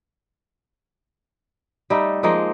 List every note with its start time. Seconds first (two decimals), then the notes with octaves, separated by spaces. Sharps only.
1.90 G3 A3 D#4
2.23 F3 G#3 A#3 D#4